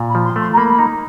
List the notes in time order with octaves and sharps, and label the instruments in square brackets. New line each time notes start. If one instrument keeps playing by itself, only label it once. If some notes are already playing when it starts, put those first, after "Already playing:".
Already playing: [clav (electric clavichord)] A#2
[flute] B5
[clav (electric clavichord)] F3
[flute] C6
[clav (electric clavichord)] A3
[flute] C6
A#5
[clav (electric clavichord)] A#3 [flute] B5
[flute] B5
[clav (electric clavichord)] D#4 [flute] A#5